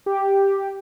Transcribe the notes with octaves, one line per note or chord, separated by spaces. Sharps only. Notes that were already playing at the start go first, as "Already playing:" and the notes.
G4